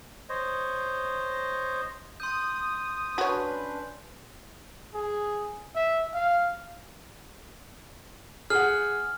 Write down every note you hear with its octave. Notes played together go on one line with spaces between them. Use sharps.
C5 C#5 D#5
C6 D#6 G6
C#4 D4 F#4 B4 C#5
G#4
E5
F5
G#4 F#5 F6